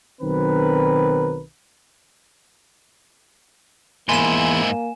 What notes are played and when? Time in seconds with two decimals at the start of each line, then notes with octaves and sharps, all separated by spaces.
0.21 B1 D#3 F#3 C4 A#4 B4
4.09 E2 G#2 A#3 E4 G#5 B5 C6 E7